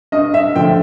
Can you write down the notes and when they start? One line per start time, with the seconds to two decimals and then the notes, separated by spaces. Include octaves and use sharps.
0.12 G2 D#5
0.34 E5
0.56 D3 F3 A3 G5